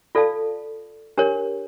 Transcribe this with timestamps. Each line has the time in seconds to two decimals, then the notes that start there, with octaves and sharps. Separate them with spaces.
0.15 F4 A4 D5 F5 A5
1.18 D4 G4 A#4 C#5